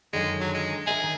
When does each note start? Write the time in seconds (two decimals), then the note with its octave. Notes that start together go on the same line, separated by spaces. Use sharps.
0.13 F#2 D3 D#3 G#3
0.40 F#3
0.54 G#3
0.87 G#4 A#4 E5
1.03 D#3